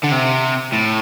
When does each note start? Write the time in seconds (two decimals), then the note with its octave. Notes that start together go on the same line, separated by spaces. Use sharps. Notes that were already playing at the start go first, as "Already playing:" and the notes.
0.04 D3
0.12 C3
0.73 A2